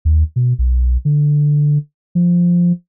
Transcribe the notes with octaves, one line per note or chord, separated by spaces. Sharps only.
D#2
B2
B1
D3
F3